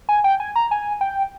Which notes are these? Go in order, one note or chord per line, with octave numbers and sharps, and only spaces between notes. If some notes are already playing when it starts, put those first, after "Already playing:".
G#5
G5
G#5
A#5
G#5
G5